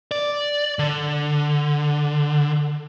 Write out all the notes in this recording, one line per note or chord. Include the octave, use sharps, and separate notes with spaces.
D5
D3